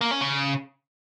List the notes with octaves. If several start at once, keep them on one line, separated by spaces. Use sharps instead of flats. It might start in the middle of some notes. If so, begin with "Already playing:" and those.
A#3
C#4
C#3